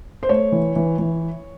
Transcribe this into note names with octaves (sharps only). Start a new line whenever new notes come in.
C5
A3 C#5
E3
E3
E3